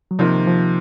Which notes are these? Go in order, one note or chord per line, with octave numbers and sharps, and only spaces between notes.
F#3
C3 D#3 F3 A#3 F4
F3